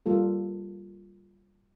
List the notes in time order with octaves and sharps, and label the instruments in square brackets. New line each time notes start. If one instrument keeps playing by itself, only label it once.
[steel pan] G3 A#3 F4 A4